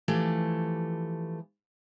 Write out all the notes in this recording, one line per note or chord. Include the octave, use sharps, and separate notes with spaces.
E3 F3 A3 G4